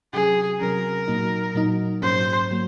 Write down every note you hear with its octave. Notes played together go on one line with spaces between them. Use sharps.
C3 F#3 C#4 G#4
C3 F#3 C#4 A#4
A#2 F#3 A#3 D#4
A#2 F#3 A#3 D#4
G#2 F#3 A#3 C#4 C5
F#3 A#3